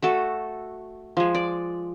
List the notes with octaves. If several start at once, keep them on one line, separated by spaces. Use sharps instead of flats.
A3 F#4 A4
F3 G#3
D5